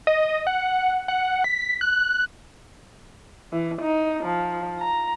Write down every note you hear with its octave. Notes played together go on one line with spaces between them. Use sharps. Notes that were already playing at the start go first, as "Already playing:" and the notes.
D#5
F#5
F#5
B6
F#6
E3
D#4
F3
A#5